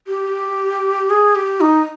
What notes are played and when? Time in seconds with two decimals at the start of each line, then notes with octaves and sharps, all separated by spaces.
0.07 G4
1.10 G#4
1.35 G4
1.61 D#4